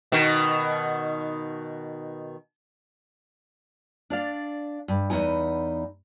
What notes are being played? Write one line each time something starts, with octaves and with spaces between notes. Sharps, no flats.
B2 D#3
D4 D5 F5
G2
E2 B3 D#4 G#5